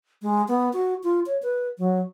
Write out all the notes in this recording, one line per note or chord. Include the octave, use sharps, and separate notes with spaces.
G#3
B3
F#4
F4
C#5
B4
F#3